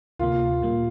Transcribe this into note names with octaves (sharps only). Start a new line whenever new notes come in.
D2 C3 A#3 F4
A#2 G3 A#3